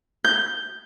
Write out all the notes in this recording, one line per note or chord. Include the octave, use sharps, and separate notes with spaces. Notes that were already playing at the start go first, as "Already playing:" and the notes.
G6